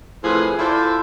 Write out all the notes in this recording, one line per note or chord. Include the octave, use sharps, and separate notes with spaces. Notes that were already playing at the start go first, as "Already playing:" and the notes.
A2 C3 F3 G#4 B4
E4 F4 A4 C5 D5